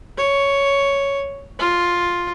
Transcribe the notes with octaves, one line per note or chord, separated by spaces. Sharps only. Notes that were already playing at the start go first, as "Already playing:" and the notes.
C#5
F4